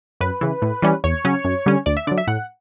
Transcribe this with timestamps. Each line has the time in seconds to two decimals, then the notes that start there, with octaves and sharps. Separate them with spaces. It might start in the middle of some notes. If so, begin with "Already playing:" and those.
0.21 F#2 B4
0.41 C#3 E3
0.62 A2
0.82 E3 G3 C#4
1.04 E2 C#5
1.25 C#3 F#3 C#4
1.44 F#2
1.66 D3 G3 C#4
1.86 D2 D5
1.97 E5
2.07 D3 F#3 D5
2.18 E5
2.27 A2 F#5